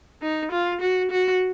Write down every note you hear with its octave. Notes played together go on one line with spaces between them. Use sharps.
D#4
F4
F#4
F#4